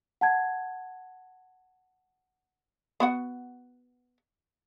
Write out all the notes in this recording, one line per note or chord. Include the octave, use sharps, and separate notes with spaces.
F#5 A5 G#6
B3 F#4 F#5